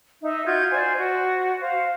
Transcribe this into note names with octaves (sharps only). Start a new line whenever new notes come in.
D#4 D#5 E5
F4 F#4 G6 G#6
C5 D5 G#5
F#4
C5 F5